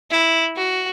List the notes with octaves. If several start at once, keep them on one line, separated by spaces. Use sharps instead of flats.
E4
F#4